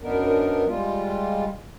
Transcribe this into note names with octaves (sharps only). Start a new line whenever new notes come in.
F#2 B3 D4 D#4 A#4
G3 G#3 F4